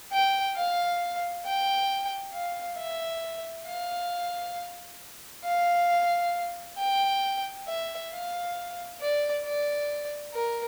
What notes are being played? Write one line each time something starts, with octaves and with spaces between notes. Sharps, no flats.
G5
F5
G5
F5
E5
F5
F5
G5
E5
F5
D5
D5
A#4